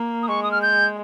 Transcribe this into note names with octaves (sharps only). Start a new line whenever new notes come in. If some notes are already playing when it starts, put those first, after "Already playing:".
Already playing: A#3
D#6
G#3 C#6
D#6
F6
G6